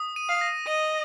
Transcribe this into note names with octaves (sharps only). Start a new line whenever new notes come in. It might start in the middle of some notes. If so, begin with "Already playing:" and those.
Already playing: D#6
D#7
F5
A#6
D#5 D#7